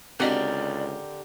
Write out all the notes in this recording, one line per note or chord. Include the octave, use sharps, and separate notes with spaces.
C#2 D3 C4 F#4 G4 A#4 D5 D#5